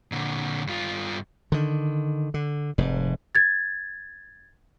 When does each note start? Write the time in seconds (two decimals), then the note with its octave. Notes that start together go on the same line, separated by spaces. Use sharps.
0.12 A#2 D3
0.67 G2 F4
1.52 D3 D#3
2.34 D3
2.78 F1 G#2
3.35 G#6 A6